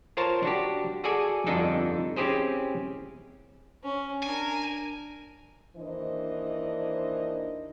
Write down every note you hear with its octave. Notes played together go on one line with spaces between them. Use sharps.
F4 A#4 C5 C#5 A5 A#5
D4 F#4 G4
F#4 G#4 A4 D5 G#5
G1 F2 D4 D#4 A4
C4 C#4 E4 G4 G#4 C5
C#4
D4 A#4 G#5
D#2 E3 D4 A#4 C5 D#5